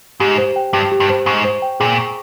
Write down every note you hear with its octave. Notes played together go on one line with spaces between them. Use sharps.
G#2 G4
C5
G5
G2 G4
G4
G2
C5
G#2 C#6
C5
G5
A#2 G#4
C#6